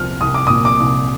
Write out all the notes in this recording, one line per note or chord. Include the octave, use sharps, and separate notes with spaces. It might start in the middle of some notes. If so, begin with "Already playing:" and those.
Already playing: C2 A#2 F3 F6
C2 D#6
D6
D#6
A#2
D6
C2